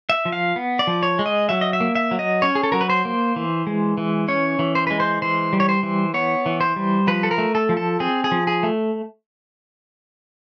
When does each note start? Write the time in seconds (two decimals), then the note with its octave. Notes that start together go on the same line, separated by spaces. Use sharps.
0.10 E5
0.25 F3
0.32 F5
0.56 B3
0.79 D5
0.87 F3
1.03 C#5
1.19 G#3
1.26 D#5
1.49 F#3 E5
1.61 D#5
1.73 E5
1.81 A#3
1.95 E5
2.11 F#3
2.19 D#5
2.42 C#4 C#5
2.55 G#4
2.63 A4
2.72 F#3 A#4
2.81 B4
2.90 C5
3.05 A#3
3.36 E3
3.67 G#3
3.98 E3
4.28 C#4 C#5
4.59 E3
4.75 C5
4.87 G#3 B4
5.00 C5
5.22 E3 C5
5.53 G3
5.60 C#5
5.69 C5
5.83 E3
6.14 B3 C#5
6.46 E3
6.61 C5
6.76 G3
7.07 F3 B4
7.23 A4
7.31 A#4
7.38 A3
7.55 A4
7.69 F3
7.77 A4
8.00 C4 G#4
8.24 G#4
8.32 F3
8.47 G#4
8.63 A3